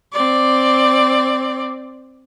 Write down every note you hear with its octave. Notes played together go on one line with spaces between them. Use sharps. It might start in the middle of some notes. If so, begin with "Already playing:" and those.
C4 D5